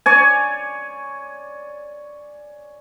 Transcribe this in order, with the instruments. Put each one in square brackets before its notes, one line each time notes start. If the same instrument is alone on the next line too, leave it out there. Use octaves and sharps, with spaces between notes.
[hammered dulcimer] C#5 D5 G#5